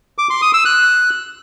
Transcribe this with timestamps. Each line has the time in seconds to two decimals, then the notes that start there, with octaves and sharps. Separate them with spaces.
0.18 D6
0.30 C6
0.42 D#6
0.54 E6
0.65 F#6